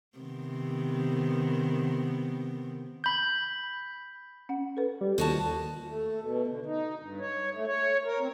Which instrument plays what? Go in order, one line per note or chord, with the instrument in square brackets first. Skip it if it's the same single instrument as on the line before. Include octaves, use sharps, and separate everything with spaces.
[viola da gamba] C3 D#3 B3
[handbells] B5 G6
[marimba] C#4 F#5
A4 B4
[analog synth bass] G3
[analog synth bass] D#2 [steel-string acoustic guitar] F3 F#4 A5 [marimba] A4
[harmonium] A3
B2
D3
D#4
G2
C#5
A3
C#5
A#4
C4